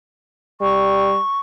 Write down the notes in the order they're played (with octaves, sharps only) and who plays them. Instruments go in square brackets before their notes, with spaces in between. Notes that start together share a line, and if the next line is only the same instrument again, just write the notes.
[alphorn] G3 [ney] C#6